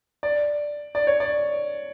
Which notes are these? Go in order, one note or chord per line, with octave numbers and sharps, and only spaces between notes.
D5
D5
C#5
D5